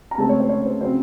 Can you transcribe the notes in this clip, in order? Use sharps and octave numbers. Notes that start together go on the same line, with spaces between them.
A#5
C#2 C#3 A3 C4 A5
C#5
C5
C#5
C5
C#3 F#3 C4 C5